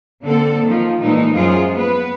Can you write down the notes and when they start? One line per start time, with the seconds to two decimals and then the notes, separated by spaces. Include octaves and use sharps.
0.22 D3 A#3 C4 A4
0.63 D#3 F3
1.00 A#2 E3 G#3 A3 D#4
1.32 F#2 F3 F#3 G#3 F4 G#4
1.71 B3 B4